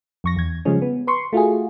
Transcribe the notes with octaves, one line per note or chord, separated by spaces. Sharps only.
F2 C#6 A#6
E2 G#6
C#3 F3 G3 G#3 C#4
B3
B4 C6 C#6
A3 F4 F#4 G#4